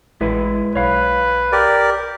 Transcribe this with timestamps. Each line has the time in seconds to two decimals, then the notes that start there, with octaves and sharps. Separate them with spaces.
0.21 A1 G#3 E4 B4
0.75 B1 B4 C#5 F5
1.52 G4 A#4 D5